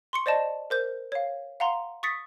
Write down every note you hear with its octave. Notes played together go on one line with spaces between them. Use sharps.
C6 C#6 C#7
C5 D5 D#5 A5
A#4 C5 G6
C#5 F5
F5 F#5 A#5 C6
C#6 D#6 A6 B6 C#7